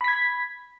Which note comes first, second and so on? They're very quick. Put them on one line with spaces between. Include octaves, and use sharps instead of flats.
B5 B6 G#6